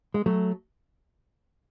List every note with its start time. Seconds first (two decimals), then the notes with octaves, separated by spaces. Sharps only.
0.14 G#3
0.26 F#3 A3